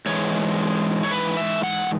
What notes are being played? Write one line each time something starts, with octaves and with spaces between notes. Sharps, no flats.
G#2 E3 G#3 C#5
C#5
B4
E5
F#5